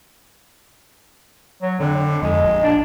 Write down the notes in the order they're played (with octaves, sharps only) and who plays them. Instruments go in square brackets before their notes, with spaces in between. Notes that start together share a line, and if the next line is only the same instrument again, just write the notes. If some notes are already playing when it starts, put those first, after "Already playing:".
[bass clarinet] F#3
[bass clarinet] F2 [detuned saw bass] D3
[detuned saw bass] F2 [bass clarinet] G#3
[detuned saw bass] A#1
[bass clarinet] D4